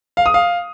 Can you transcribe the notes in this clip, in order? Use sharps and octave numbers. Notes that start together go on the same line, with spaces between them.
F5
D#6
F5